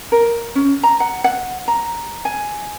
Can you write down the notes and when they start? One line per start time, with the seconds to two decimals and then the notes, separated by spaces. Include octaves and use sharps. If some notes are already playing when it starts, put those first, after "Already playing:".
0.12 A#4
0.55 C#4
0.83 A#5
1.00 F#5
1.24 F#5
1.68 A#5
2.25 G#5